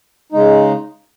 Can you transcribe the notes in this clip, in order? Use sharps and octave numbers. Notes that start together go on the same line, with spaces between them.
C#3 G#3 D#4